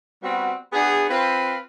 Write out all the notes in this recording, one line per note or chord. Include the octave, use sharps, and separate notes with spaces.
G3 B3 C4 F#4
B3 D4 F#4 G#4
C4 F4 B4